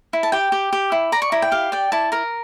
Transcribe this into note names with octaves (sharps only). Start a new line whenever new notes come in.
E4
A5
G4 G5
G4
G4
E4
D5 A#5
C#6
E4 A#5
G5
G4 F5
D5 G5
E4 A5
A#4 A#5